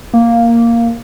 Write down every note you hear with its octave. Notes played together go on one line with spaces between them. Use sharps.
A#3